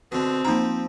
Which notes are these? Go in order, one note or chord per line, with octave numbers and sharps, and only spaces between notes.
B2 D3 C4
F3 A#3 D#4 G5 A#5